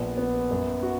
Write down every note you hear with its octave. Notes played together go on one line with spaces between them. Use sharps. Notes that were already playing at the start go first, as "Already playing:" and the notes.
Already playing: A#1 B3
B3
F#2
F#4